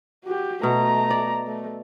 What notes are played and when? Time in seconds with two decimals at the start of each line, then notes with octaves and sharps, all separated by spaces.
0.25 F#4 G4
0.63 B2 A3 A#5
1.10 D5
1.47 A3